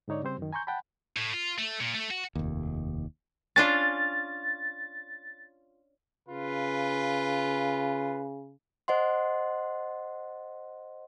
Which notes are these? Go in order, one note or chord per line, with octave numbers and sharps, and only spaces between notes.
G#2 D3 D#4 C#5 D5
C#3 G3 C4 C5
F#2 D#3
G#5 A#5 C6 C#6 G6
F#5 G5 A5 B5
A2
F4
A3
A#2
A3
F#4
F1 D#2
C#4 D4 F4 A6
C#3 F4 B4
C5 D#5 F#5 C6